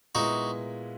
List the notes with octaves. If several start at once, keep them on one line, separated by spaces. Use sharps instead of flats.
A#2 G#3 B3 D#4 E4 F#4